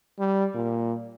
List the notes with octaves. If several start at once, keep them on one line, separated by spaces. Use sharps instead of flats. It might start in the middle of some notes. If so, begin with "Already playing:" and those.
G3
A#2